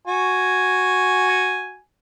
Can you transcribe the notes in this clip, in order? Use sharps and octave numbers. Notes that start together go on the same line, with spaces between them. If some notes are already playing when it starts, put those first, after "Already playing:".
F#4 G#5